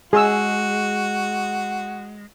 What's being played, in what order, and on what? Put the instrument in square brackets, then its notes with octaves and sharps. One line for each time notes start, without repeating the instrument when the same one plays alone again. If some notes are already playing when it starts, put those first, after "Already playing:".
[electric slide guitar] G#3 [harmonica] F#4 [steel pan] G#4 E6